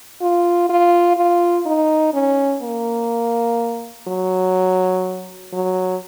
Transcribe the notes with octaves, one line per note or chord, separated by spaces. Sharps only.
F4
F4
F4
D#4
C#4
A#3
F#3
F#3